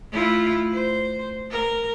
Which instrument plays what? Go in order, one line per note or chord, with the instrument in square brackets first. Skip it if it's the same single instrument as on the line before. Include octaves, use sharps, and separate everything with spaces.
[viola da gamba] A3 E4 F4
C5
A#4